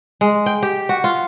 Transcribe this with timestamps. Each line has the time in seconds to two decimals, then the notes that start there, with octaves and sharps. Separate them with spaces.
0.21 G#3
0.46 G5
0.63 G4
0.89 F#4
1.04 F4